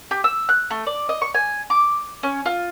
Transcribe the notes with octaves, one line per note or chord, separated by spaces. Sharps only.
G4
E6
F#6
A3
D5
D#5
C#6
G#5
D6
C#4
F4